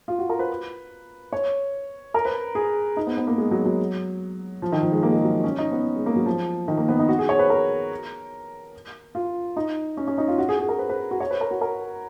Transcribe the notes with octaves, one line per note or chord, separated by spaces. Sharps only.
F4
F#4
A#4
B4
C#5
A#4
B4
G#4
D#4
B3
B3
A#3
G#3
F#3
F#3
F3
D#3
F3
G#3
A#3
G#3
F#3
C#4
D#4
B3
G#3
A#3
F#3
F3
D#3
A#3
B3
D#4
F#4
G#4
C#5
B4
A#4
F4
D#4
C#4
C#4
D#4
F4
F#4
G#4
G#4
A#4
B4
B4
F#4
C#5
B4
A#4
F#4
A#4